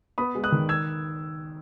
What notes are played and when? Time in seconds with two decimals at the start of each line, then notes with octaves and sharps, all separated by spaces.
0.18 B3 B5 D#6
0.35 G#3
0.44 D#6 F#6
0.52 D#3
0.69 E6 G#6